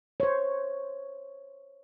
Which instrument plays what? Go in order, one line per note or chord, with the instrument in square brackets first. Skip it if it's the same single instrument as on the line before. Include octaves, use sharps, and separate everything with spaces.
[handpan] C5 C#5